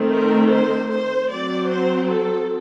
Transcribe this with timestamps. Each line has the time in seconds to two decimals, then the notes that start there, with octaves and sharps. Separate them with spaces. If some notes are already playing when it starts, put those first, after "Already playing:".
Already playing: D#3 A3 C4
0.09 A#4
0.49 C5
0.89 C5
1.29 F#3 C4 D5
1.69 C5
2.09 A4